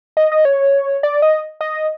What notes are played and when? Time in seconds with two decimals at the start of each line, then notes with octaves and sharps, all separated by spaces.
0.17 D#5
0.32 D#5
0.45 C#5
1.03 D5
1.22 D#5
1.61 D#5